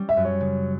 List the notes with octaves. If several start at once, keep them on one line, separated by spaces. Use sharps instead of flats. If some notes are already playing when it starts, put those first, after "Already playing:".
Already playing: G3 C#4
E5
F#2
C#5
C#3